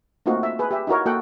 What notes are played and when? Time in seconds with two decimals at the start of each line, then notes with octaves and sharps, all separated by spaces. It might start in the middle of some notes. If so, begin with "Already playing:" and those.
0.26 A3 A#3 C4 D#4 F4 F#4
0.43 E5
0.59 G#4 B4
0.71 G4 E5
0.87 D#4 E4 F#4 A#4 C#5
1.06 A#3 F#4 A4 F#5 G5